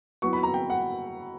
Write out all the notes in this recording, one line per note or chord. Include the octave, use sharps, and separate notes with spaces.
F#3 B3 E4 C#6
B5
A#5
G5
F#5